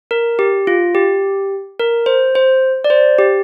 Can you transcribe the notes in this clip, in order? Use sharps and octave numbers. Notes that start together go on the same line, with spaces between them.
A#4
G4
F4
G4
A#4
C5
C5
D5
C5
G4